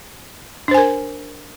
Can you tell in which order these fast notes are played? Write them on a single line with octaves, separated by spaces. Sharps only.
D4 C5 G#5 A#4